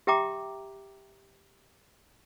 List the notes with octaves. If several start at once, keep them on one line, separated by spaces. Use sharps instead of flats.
G4 E5 G5 A#5 D6